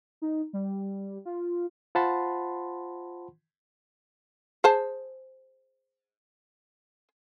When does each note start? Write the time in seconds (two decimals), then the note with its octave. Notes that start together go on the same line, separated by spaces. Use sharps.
0.22 D#4
0.53 G3
1.26 F4
1.95 F4 C5 F#5 A5 B5 C6
4.64 G#4 C5 A5